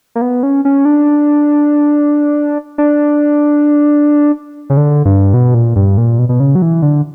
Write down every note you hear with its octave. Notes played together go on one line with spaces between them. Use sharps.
A#3
B3
C#4
C#4
D4
D4
C#3
D3
G2
B2
A#2
G2
A#2
B2
B2
C#3
F#3
E3
D3